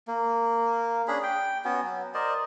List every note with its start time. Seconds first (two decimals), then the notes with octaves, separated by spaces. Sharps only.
0.08 A#3
1.08 C#4 D4 G#4 B5
1.23 G5
1.65 B3 C#4 F#4
1.82 F#3
2.14 A#4 C5 D5 D#5